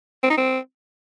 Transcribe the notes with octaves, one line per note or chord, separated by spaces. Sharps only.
C4
D#4
C4